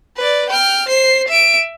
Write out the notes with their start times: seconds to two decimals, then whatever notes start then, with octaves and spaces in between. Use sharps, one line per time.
0.17 B4 D5
0.50 G5 F6
0.89 C5 C7
1.28 E5 D7